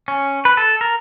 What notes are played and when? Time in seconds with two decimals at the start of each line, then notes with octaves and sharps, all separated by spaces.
0.08 C#4
0.45 B4
0.57 A4
0.81 A#4